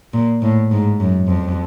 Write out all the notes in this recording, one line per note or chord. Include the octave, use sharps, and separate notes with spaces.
A#2
A2
G#2
F#2
F2